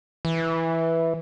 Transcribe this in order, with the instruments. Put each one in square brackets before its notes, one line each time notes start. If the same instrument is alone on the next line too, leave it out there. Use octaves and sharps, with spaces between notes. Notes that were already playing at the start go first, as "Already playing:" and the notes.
[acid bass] E3